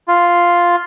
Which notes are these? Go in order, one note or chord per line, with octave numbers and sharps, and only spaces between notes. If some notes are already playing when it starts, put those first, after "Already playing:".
F4